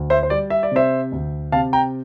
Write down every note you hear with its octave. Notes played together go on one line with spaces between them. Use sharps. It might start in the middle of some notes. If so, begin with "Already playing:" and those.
Already playing: D2
C5 E5
C5
G3 D5
E5
D5
C3 C5 E5
D2
C3 F5 A5
G5 A#5